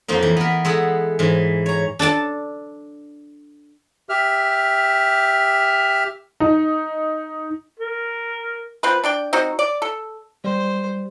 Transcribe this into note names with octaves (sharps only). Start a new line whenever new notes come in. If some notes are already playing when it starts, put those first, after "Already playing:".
F2 F3 A#3 D#4
E3
B3 A#4
G#3 G#4 A4 F#5
G#2 E3
C#5 A#5
D4 A4 D5 A5
G4 E5 F6
D#4
A#4
F3 C4 B4
D4 D5 G5
C4 D#4 F#4
D5
A4
G3 C5